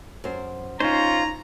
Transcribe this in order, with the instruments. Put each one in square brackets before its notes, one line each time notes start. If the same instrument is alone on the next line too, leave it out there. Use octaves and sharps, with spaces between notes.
[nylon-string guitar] F#2 C5
[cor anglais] C#4 [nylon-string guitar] D#4 [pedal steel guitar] F4 C5 [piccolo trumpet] A#5